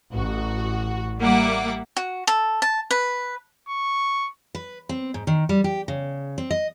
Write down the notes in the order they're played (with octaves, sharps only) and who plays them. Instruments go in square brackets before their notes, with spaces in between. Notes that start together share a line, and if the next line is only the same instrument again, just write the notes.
[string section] A1 F#4
G3 A#3 E5 F#5 D6
[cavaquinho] F#4
A4
A5
B4
[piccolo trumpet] C#6
[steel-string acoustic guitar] B4
C4
G#2
D#3
G3
G4
C#3
C4
D#5